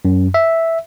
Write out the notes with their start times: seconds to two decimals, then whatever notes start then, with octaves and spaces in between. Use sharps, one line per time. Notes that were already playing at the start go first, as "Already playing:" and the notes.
0.05 F#2
0.34 E5